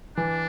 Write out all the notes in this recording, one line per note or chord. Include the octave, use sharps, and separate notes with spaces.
E3 D4